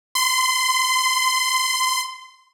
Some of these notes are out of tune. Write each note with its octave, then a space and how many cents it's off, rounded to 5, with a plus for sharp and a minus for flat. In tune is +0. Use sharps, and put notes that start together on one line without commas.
C6 -25